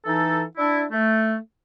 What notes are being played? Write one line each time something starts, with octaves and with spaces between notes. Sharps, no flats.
E3 D#4 A4
D4 E4
A3